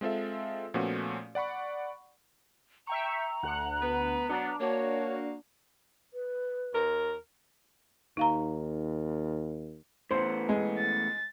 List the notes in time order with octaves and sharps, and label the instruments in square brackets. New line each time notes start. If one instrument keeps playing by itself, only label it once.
[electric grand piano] G#3 C4 F4 A4 E5
A#2 F3 A3 B3 C#4 F#4
D5 F#5 B5 C#6
[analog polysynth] E5 G5 C#6 [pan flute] A#5
[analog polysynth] D2 F#5 F#6
[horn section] B3 B4
[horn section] F#3 B3 [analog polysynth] D4
[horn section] A#3 F#4 [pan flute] C#5
[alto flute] B4
[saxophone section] D#2 A#4
[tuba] D#2 [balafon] D#4 F5 A#5
[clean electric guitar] A2 E3 B3 [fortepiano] C5
[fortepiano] G#3
[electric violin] A6